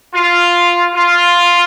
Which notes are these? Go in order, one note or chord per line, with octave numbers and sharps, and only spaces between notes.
F4
F4